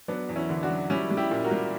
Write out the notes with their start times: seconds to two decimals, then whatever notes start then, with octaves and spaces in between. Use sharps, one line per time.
0.08 F#3 B3 D4
0.29 E2
0.36 C#4 E4
0.49 D3
0.63 D4 F#4
0.70 F#3
0.90 G3 C#4 E4
1.11 G3
1.17 E4 G4
1.31 A#2
1.44 F#4 A#4
1.51 G3